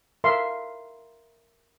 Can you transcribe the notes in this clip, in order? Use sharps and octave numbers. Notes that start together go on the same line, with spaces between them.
A#4 E5 F5 C6